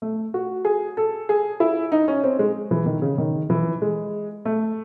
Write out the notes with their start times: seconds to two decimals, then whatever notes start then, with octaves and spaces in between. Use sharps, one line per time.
0.02 A3
0.34 F#4
0.65 G#4
0.97 A4
1.29 G#4
1.60 E4
1.92 D#4
2.08 C#4
2.24 C4
2.39 G#3
2.71 E3
2.86 D#3
3.02 C#3
3.18 D#3
3.50 E3
3.82 G#3
4.45 A3